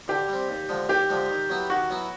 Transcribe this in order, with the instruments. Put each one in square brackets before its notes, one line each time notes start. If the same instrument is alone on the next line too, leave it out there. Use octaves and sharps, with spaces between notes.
[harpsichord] D3 [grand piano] G4
[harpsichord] G3 C4
D#2
D3 F3 G#3
[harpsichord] D#2 [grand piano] G4
[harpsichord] D3 F3 G#3
D#3
F#3 B3 E4
[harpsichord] D#3 [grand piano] F#4
[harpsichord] F#3 B3 E4